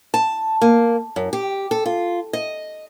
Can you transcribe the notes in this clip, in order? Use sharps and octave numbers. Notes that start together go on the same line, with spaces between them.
A5
A#3
F#2
G4
A4
F4
D#5